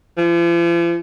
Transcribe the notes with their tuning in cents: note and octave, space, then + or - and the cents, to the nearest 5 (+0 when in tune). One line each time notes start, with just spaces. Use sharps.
F3 -45